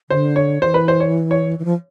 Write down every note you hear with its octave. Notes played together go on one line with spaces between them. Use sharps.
D3 C5
C#5
E3 C5
B4
C5
C#5
C#5
E3
F3